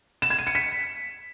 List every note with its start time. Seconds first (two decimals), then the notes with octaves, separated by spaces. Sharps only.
0.22 E7
0.30 G#6
0.39 D#7
0.47 C#7
0.55 B6